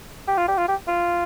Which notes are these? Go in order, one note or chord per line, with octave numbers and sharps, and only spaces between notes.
G4
F4
G4
F4
G4
F4